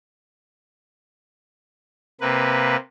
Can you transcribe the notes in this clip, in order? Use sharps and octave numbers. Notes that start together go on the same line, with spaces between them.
C3 A#3 B4